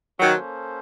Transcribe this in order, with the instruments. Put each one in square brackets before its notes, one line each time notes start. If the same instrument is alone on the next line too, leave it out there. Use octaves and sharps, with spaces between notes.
[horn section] D#3 F#3 [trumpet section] A#3 C#4 A4 C5